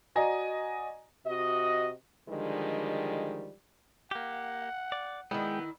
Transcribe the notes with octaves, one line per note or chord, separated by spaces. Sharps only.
F#4 D5 D#5 G#5 A#5
C3 F#4 D#5
D3 D#3 F3 G3 G#3
A#3 G4 F#5
D5
D#3 G#3 B3 E4 G5